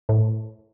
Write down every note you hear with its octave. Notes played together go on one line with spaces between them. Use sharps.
A2